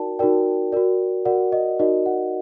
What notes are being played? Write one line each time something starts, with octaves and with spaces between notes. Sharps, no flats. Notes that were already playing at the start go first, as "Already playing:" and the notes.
Already playing: D#4 F#4 A#4 D5 G5 A5
D#4 F#4 A#4 D5 G5
F#4 A#4 D5
F#4 A#4 D5 F#5
D#5
D#4 F#4 A#4 D5 D#5
F#5